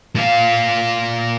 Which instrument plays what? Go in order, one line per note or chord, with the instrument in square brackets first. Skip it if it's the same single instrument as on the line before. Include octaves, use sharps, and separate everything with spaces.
[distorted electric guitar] A#2 F5